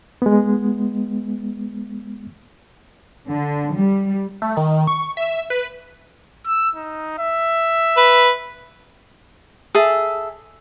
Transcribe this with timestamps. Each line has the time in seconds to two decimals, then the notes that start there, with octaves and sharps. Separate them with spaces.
0.22 G#3 B3
3.28 D3
3.76 G3
4.42 A3
4.57 D#3
4.87 C#6
5.17 E5
5.50 B4
6.46 E6
6.76 D#4
7.19 E5
7.97 B4
9.75 G#4 A4 E5